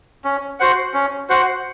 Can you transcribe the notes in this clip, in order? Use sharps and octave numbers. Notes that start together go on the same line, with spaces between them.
C#4
F#4 C5 F#5
C#4
F#4 C5 F#5